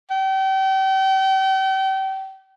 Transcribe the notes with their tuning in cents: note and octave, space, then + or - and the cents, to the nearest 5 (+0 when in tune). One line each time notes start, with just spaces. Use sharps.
G5 -35